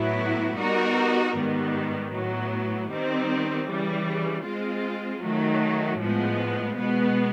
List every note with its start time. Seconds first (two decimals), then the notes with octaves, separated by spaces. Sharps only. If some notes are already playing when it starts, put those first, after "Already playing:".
Already playing: A2 F#3 B3 E4
0.57 G3 B3 D#4 F#4 A#4
1.36 G#2 D#3 G3 B3
2.13 A2 F#3 B3
2.90 D#3 G3 C4
3.68 C#3 E3 G3
4.45 G#3 C4 F4
5.23 D#3 F#3 A3
6.00 A2 F3 G#3 B3
6.77 B2 G#3 B3